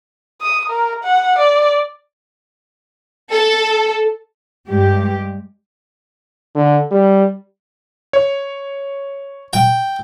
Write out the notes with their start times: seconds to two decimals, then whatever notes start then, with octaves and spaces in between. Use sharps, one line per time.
0.41 D#6
0.70 A#4
1.04 F#5
1.39 D5
3.32 A4
4.69 G2 G#3 G4
6.55 D3
6.91 G3
8.13 C#5
9.53 G5